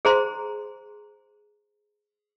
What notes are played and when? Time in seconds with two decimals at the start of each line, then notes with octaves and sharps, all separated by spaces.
0.05 G#4 C5 A#5 C6